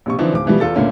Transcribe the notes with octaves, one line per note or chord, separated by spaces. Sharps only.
A#1 C3 C#6
D3 E3 F3 C4 D4 D#4
D1 D6
B2 E3 F3 G3
E2 F4 A4 A6
C#2 A#2 D3 A3 A#3 C#4